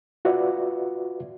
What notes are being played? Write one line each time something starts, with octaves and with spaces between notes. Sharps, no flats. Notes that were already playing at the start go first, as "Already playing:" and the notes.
F4 F#4 B4 D5 E5